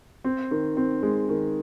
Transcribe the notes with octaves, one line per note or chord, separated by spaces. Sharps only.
C4
D#3
C4
G#3
D#3